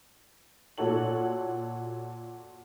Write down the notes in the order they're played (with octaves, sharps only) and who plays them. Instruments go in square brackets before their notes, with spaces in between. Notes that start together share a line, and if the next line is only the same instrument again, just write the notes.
[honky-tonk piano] A#2 F#4 A4 C#5 F#7